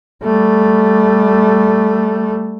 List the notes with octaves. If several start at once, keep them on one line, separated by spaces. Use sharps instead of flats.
G3 A3